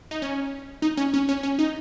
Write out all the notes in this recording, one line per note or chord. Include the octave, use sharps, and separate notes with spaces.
D#4
C#4
D#4
C#4
C#4
C#4
C#4
D#4